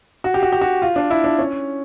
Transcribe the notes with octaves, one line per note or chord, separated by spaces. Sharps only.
F#4
G4
F#4
G4
F#4
F4
D4
E4
D4
C#4